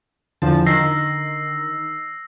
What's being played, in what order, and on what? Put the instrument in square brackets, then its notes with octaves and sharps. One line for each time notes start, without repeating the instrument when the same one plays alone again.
[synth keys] E2 F3 A5 [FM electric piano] D3
[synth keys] D#3 [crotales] E6 A#6 C7